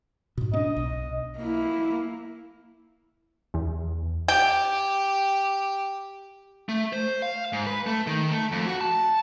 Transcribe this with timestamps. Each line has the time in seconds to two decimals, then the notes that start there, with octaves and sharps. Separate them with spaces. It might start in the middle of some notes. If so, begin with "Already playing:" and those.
0.38 G#2 B2
0.53 B3 D4 D#5
0.77 B1
1.38 A#3 E4
3.54 E2
4.28 G4 G5
6.69 A3
6.93 C5
7.22 F5
7.53 G#2
7.67 B4
7.87 A3
8.07 D#3
8.31 A3
8.52 F2
8.67 F#4
8.81 A5